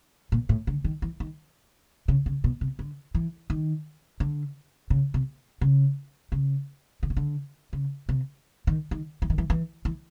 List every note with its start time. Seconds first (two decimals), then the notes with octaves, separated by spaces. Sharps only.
0.32 A#2
0.49 A2
0.67 D3
0.84 D#3
1.02 E3
1.20 D#3
2.08 C#3
2.26 C#3
2.44 B2
2.61 C3
2.79 D3
3.15 E3
3.50 D#3
4.20 D3
4.90 C#3
5.14 C3
5.61 C#3
6.32 C#3
7.03 D3
7.10 C#3
7.17 D3
7.73 C#3
8.09 C3
8.67 D#3
8.91 D#3
9.22 E3
9.30 D#3
9.38 E3
9.50 E3
9.85 E3